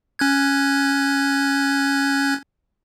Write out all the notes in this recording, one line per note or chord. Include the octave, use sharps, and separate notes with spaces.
C#4 F#6 G#6